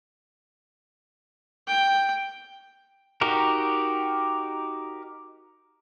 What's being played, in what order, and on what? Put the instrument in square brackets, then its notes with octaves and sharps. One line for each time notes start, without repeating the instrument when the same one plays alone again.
[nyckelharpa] G5
[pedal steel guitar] D#4 F#4 G4 A#4